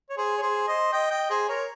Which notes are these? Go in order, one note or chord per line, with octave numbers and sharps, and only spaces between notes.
C#5
G#4 C5
C#5
G#4 C5
C5 D#5
D#5 G5
D#5 G5
G#4 C5
A#4 C#5